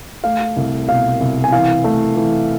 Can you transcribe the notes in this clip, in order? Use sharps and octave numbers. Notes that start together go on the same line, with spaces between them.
A3 F5
C2
B2 F5
C2
G#5
E3 F5
A3
E3